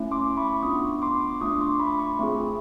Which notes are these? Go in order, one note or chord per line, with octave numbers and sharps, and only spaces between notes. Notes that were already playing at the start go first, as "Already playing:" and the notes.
Already playing: A3 C#4 E4
C6 D6
B5 C#6
B3 D4 F4 C#6 D#6
C6 D6
A3 D4 F4 C#6 D#6
C6 D6
B5 C#6
B5 C#6
A3 C4 F4 G#4